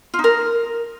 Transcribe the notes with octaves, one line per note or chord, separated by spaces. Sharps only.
F4
D#4
A#4